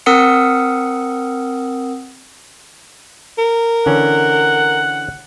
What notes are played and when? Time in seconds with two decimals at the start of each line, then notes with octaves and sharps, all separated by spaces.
0.06 C4 A#4 F#5 D#6 E6 C#7
3.38 A#4
3.86 D3 E3 C#4 F#5